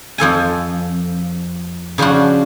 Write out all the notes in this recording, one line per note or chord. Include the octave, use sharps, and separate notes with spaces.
F2 F3 A4 G#5
C#3 F3 D4 F4 F#4